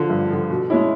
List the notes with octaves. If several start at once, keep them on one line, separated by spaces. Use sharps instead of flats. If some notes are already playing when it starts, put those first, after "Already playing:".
Already playing: D3 F3
G2
D3 F3
B2
G#3 C#4 E4